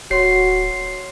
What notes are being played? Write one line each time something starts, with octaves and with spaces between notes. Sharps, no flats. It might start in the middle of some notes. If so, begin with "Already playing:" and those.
D1 F#4 C#5 C6 C7